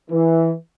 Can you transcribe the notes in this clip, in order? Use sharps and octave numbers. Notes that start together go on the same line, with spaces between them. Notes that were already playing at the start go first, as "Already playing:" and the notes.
E3